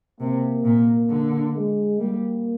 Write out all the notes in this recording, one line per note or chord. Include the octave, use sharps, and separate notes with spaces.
C3 A#3
A#2
D3
G#3
G3 A#3